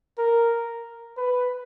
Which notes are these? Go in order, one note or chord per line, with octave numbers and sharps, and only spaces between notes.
A#4
B4